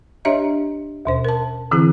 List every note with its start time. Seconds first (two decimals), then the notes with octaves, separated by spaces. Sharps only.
0.25 D4 G4 C#5 D#5 E5 A#5
1.05 D#2 B2 C5
1.25 A#4 A5
1.71 D3 E3 C4 E4 G#4